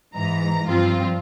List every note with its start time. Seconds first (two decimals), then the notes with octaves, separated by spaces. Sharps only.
0.15 G#2 E3 A#5
0.68 G2 F3 C4 F4